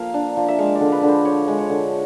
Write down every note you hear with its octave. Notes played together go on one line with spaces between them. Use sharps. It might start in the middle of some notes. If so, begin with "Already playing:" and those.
Already playing: F3 A#3 F5
D4
F3
E5
G#3 F5
D5
D3
B4
D3
C5
F3 C#5
G#3
C#5
D3